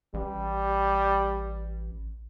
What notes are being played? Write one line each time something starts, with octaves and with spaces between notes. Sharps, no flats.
A1 G3